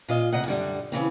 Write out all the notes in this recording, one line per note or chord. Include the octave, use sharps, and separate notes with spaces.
A#2 F4 D#5
D2 C3 D#5 F#5
F#2 D3 G3
C#3 E3 C4